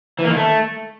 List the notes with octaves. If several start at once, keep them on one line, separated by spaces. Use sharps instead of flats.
E3
A#3
D#3
A3